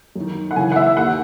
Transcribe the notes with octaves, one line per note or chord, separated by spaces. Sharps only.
F#2 D#3
F#5
F#2 C#3 E3 G#5
F#5
E5
D#2 D#3 F#5